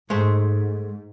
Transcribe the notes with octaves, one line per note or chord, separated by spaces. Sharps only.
G#2 G#3 A3 C5